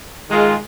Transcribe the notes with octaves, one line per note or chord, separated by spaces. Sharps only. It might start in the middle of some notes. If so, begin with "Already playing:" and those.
D#3 G#3 F4